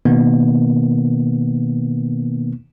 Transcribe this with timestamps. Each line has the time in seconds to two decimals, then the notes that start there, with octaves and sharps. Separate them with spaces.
0.05 B2 D#3 A#3 B3